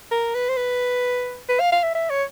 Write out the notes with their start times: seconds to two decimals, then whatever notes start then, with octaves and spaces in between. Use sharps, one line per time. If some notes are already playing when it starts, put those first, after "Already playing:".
0.11 A#4
0.34 B4
0.49 C5
0.57 B4
1.49 B4
1.60 F5
1.72 F5
1.83 E5
1.95 E5
2.10 C#5